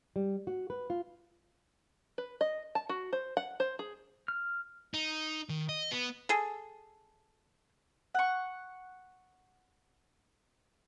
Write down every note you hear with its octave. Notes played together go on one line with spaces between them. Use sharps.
G3
F#4
B4
F4
B4
D#5
A5
F#4
C5
F#5
C5
G#4
F6
D#4
D#3
D#5
B3
G#4 A4
F#5 C#6